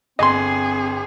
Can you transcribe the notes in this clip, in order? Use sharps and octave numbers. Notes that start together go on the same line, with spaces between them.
G1 C4 G#4 D#5 C6